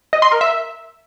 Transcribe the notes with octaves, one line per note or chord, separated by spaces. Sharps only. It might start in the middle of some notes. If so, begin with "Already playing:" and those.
D#5
C6
A#4
E5